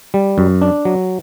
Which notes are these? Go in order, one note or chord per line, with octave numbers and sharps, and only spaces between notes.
G3
F#2
D4
F#3